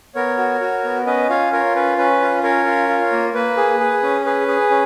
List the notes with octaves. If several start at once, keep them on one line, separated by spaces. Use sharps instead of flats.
B3 A#4 C#5
F#4
F#4
B3
C#4 B4 D#5
F4 C#5 F5
F4 A#4 C#5
C#4 B4
C#4 B4
F4
C#4 A#4 C#5
F4
F4
A#3
A#3 B4
G#4
G#4
C#4
G#4 B4
G#4
C#4